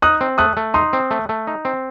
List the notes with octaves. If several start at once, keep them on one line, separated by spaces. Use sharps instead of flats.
D#4 D#6 F#6
C4
A3 D#6 F#6
A3
D#4 C6 D#6
C4
A3
A3
D#4
C4